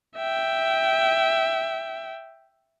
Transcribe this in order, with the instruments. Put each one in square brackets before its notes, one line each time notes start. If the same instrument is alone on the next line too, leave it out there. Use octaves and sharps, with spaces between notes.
[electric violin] E5 G5